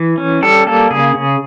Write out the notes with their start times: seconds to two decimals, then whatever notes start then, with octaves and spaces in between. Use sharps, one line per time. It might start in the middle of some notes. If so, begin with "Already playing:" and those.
Already playing: E3
0.18 C#4
0.42 G3 A4
0.66 A#3 A4
0.91 C#3 G#4
1.15 C#3